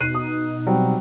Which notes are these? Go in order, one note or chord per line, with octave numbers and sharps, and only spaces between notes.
B2 D#4 F#6 C7 D#7
D#6
F#3 G3 C4